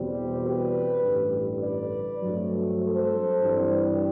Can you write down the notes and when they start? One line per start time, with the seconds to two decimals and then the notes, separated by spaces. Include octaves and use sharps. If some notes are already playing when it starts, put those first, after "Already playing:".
Already playing: E2 B2 G3 C4
0.43 G4 B4
1.03 A1 G2 D3
1.62 B4 D5
2.22 G2 F#3 A3 C4
2.82 A4 C5
3.40 G2 E3 G3 C4